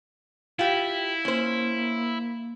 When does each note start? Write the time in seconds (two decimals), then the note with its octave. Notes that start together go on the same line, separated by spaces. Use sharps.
0.59 E4 F4 G4
1.25 A#3 C#4 C5